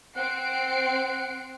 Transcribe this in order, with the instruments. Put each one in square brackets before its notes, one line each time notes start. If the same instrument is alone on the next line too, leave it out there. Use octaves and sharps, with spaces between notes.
[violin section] C4 C7 D7 [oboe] F#5